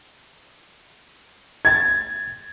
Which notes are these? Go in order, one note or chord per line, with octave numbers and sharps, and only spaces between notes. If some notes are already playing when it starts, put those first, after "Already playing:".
G#6 A6